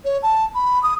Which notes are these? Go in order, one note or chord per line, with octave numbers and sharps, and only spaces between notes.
C#5
A5
B5
D#6